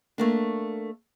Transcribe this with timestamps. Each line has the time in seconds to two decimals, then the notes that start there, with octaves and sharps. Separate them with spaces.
0.18 A3 A#3 D4